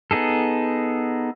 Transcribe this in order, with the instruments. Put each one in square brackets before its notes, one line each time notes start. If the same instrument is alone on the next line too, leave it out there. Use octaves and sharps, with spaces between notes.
[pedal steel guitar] B3 D#4 G#4 A4